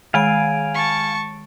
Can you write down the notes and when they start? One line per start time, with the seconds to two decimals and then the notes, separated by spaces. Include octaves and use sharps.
0.14 D#3 G#3 F5 G#5 D7
0.74 A5 C#6